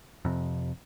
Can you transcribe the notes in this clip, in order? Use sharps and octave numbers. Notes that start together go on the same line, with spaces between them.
F2 C3